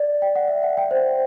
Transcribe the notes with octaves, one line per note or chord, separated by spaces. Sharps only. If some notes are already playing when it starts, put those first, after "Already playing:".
Already playing: D5
G5
F#5
E5
F#5
G5
C5